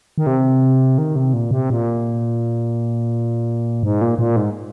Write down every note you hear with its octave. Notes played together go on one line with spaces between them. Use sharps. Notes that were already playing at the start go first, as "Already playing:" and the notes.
D#3
C3
D#3
C3
A#2
C3
A#2
G#2
A#2
A#2
G#2